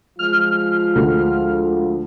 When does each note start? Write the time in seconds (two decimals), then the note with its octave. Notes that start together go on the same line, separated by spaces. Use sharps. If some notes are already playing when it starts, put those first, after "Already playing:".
0.19 F3 G#3 F4 F6
0.95 D2